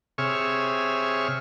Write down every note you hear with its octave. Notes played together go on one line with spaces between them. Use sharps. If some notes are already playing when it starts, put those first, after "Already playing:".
C3 G#4 C#5 E5 C#6 F6